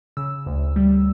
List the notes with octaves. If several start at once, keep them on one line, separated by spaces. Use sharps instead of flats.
C#3 E6
D2
G3